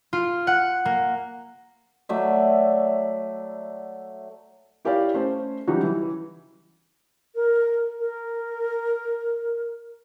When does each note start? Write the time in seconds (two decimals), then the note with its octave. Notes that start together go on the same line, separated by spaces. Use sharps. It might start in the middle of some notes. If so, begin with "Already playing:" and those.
0.13 F4
0.47 F#5
0.85 A#3
2.09 F#3 A3 D5 E5
4.85 E4 G4 A#4 C#5 D5 F5
5.14 A3 C#4 C5 C#5
5.67 E3 F#3 G3 C#4 D#4 F#4
5.83 E3
7.35 A#4
7.99 A#4